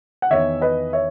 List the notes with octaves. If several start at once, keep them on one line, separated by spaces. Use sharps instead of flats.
F#5
E2 D#3 C#5 E5
B4 D#5
C#5 E5